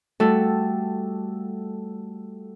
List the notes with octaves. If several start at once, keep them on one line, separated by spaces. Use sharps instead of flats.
G3 A3 F#4 A4